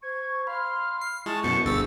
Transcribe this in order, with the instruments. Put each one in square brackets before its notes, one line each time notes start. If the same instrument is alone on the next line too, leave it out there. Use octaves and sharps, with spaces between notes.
[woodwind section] C5 C#6 [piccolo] G#6
[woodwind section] F5 C6 [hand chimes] B5 [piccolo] F6
[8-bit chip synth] C7
[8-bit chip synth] G#3 [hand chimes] E4 [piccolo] A5 [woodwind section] C#6
[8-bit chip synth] F#2 B2 [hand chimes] B3 G6 [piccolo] C#7
[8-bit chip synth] G1 D2 A6 [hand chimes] D4 G#4 [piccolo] E6